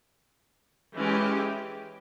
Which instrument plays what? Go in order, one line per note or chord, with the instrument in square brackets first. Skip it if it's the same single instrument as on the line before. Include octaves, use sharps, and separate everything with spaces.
[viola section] E3 G#3 C#4 E4 G4